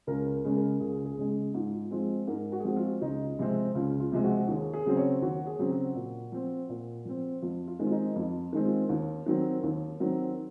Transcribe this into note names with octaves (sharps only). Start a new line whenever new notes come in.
C#2 A#4
C#3 G#3
A#4
C#2 G#4
G#4
C#3 G#3
G#4
G#2 F4
F4
F3 G#3 C4 F4
F4
G#2 A#4
F#4
G#4
F3 G#3 C4 F#4
F4
C#2 D#4
C3 F3 G#3 C4
C#2 F4
F4
C3 F3 G#3 C4
F#4
D#2 G#4
G#4
C#3 F#3 C4
C#5
D#2 F#4
G#4
C#3 F#3 C4
F#4
A#2
F3 C4
A#2
F3 C4
F2 F4
F4
D#3 G#3 C4
F4
D#4
F2 F4
D#3 G#3 C4
F4
D#2
D#3 F#3 C4
D#2
D#3 F#3 C4